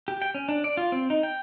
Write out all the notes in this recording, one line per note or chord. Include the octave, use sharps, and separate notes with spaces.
G4
G5
C#4
D4
D5
F4
C4
D#4
G5